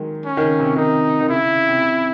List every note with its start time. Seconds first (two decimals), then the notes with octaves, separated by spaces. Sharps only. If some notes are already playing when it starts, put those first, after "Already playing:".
Already playing: D#3 F#3 G#3
0.25 C#4
0.37 D#3
0.43 C#3
0.59 C3
0.76 D#3 D#4
1.21 D#3
1.29 C#3 E4
1.42 C#3
1.55 C#3
1.69 C3
1.81 C3